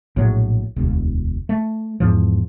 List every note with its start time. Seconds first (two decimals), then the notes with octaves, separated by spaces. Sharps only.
0.16 A#1 A2 F#3
0.76 E1 D2
1.49 A3
2.00 E2 G#2 F3